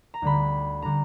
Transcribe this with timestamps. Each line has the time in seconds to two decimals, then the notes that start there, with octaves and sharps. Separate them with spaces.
0.14 A#5
0.22 D2 D3 G3 B5
0.82 D3 G3 A#5